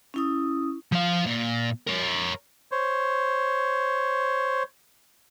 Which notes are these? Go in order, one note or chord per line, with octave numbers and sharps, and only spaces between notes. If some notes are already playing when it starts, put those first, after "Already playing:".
C#4 E4 D#6
F3 F5
A#2
A#4 C#5
C5 C#5